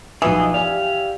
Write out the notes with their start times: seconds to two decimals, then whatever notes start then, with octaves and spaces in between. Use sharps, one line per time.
0.22 B1 E3 F3 G#4 D#5 E6
0.54 G4 D5 F5 G#5